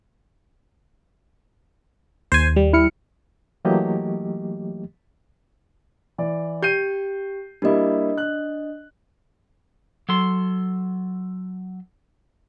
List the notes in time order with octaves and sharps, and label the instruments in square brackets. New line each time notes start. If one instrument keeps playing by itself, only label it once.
[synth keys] D#2 [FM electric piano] C5 G#5
[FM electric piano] G3
[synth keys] E4 F6 C#7
[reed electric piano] E3 F#3 A3 A#3 G4 D#5
[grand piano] E3 D5
[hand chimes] G4 [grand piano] G6 C7 D#7
[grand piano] G3 A#3 E4 [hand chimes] D4 D#5
[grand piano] F#6
[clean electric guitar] F#3 A4 C6